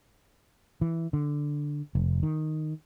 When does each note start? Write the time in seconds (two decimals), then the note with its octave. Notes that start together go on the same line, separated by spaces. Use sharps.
0.81 E3
1.13 D3
1.95 F1
2.23 D#3